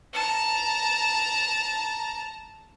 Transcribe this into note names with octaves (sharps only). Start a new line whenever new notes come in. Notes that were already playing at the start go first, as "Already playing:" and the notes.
A5 A#5